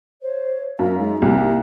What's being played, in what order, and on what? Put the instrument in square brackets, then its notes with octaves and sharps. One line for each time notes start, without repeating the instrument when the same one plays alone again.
[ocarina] C5 [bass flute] C#5
[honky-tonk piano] F#2 [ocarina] A#4 [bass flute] F5
[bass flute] G#3 [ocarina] D#4
[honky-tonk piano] C2 [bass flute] A#3